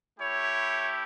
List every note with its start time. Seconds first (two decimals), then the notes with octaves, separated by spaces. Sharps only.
0.19 A3 E4 G4 C#5